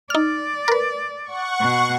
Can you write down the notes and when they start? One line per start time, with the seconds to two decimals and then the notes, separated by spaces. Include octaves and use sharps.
0.10 D#4 D5 F6
0.68 A#4 B4
1.24 F#5 C#6
1.60 B2